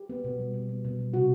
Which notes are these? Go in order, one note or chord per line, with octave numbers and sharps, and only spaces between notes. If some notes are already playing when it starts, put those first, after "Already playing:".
Already playing: G4
B3
B2
G3
B2
B3
B2
G3
C3 F#4